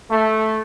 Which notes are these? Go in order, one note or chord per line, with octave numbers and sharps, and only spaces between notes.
A3